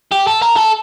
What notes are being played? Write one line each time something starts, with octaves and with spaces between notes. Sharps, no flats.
G4
A4
A#4
A4